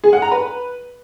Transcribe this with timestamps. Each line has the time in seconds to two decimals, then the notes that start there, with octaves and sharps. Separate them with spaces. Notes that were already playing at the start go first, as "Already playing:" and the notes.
0.04 G#4
0.13 F#5
0.22 A#5
0.32 B4